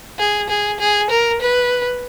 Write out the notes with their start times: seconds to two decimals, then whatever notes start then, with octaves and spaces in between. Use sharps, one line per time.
0.19 G#4
0.50 G#4
0.80 G#4
1.10 A#4
1.41 B4